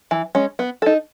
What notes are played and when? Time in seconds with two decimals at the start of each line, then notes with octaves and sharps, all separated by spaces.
0.11 E3
0.35 G#3 C#4
0.59 B3
0.82 D#4 A4